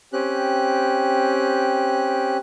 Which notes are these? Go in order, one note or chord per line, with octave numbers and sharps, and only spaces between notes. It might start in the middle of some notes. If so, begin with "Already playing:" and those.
C4 C#4 G4 F#6